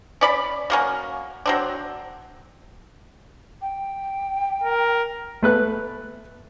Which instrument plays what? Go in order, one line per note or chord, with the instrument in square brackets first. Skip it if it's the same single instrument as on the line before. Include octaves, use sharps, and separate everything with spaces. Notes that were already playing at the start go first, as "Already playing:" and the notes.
[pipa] C#4 D5 B5
F#3 A#3 C#4
F#3 C4 D4
[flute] G5
[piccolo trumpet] A#4
[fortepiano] A3 B4 F#6